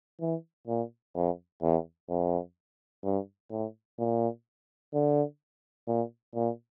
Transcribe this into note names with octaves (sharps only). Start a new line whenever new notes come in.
E3
A#2
F2
E2
F2
G2
A2
A#2
D3
A#2
A#2